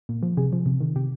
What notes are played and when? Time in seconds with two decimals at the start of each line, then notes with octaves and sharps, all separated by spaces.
0.09 A#2
0.23 F3
0.37 C3 G#4
0.53 F3
0.66 C3
0.80 D#3
0.96 C3 G4